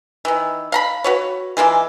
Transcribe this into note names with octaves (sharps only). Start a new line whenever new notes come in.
D#3 E3
F5 A#5 B5
F#4 B4 C#5
E3 G#3 A#3 F4